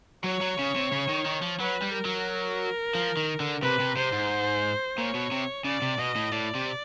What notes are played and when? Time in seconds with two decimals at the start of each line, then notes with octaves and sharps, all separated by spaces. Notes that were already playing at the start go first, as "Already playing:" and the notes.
0.24 F#3 C#5
0.41 F#3
0.59 C#3
0.76 C3
0.92 C#3
1.09 D#3
1.26 D#3
1.42 F3
1.59 F#3 B4
1.82 G3
1.94 A#4
2.05 F#3
2.95 F3
3.17 D#3
3.40 D3
3.62 C3 B4
3.80 C3
3.96 C3 C5
4.13 G#2
4.98 A#2 C#5
5.15 B2
5.32 C3
5.65 C#3 D5
5.82 C3
5.99 B2 D#5
6.16 A2
6.32 A2 D5
6.55 C3